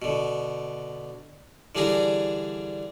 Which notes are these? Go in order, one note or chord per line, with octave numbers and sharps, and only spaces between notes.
B2 D3
D3 E3 G3 D4 G#4 A#5